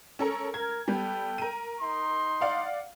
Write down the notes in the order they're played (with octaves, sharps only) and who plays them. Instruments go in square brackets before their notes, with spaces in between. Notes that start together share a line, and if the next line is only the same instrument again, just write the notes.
[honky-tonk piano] C#4 A4 A#4
[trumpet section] A#4 [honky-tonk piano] G#6
[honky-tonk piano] G3 B3 [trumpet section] A4 G5
[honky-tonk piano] A#4 D#7
[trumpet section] D#4 C6
[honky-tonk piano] D5 F5 F#5